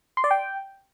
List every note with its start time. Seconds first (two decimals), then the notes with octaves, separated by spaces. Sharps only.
0.17 C6
0.24 D5
0.31 G5